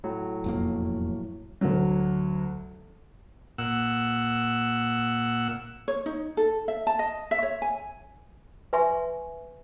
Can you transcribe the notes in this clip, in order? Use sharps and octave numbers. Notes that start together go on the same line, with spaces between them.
A2 F#3
E1 F2 A#3
D2 F#3
A#2 F#5 E6
C#5
D#4
A4
E5
A5
D#5
E5
C#5
G#5
B4 E5 G#5 C6 C#6